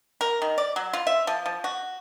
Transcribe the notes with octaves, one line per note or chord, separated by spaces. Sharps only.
A#4
D#3
D5
F#3
F4
E5
F3
F3
F#4